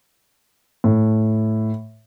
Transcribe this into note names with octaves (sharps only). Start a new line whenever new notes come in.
A2